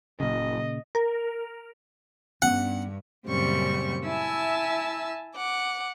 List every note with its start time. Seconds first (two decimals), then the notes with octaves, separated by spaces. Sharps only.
0.20 F#1 A#2 C#3 D#5
0.95 A#4
2.42 G2 B3 C#4 D4 F#5
3.28 F#2 A#2 C#3 G3 C4 C#6
4.07 E4 E5 G#5 A5 E6
5.36 F#5 D6